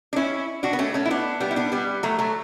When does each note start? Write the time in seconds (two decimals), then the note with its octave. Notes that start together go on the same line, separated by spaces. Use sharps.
0.13 D4
0.16 C#4 E4
0.63 D4 F#4
0.73 B3
0.79 A3 C#4
0.94 A3 C#4
1.06 E4
1.11 B3 D4
1.40 G3 B3
1.51 E4
1.56 B3 D4
1.72 G3 B3
2.03 F#3 A3
2.19 F#3 A3